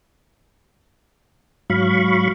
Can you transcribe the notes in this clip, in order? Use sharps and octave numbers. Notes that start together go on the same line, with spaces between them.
G#2 F#3 F5 B5 C#6